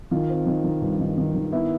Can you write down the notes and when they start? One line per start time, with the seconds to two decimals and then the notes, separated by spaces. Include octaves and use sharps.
0.11 D#3 F4
0.29 C4
0.47 D#3
0.64 D#3
0.82 G2
1.00 D#3
1.18 D#3
1.35 D#3
1.52 B3 E4